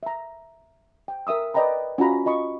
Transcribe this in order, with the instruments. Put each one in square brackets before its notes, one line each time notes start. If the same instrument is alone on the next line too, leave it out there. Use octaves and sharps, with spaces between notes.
[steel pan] E5 A#5
G5
A#4 E5 D#6 E6
B4 D5 D#5 G5 A#5 B5
C#4 F4 F#4 A#5 B5
F4 D#5 B5 C#6